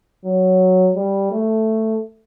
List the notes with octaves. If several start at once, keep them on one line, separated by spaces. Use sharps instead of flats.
F#3
G3
A3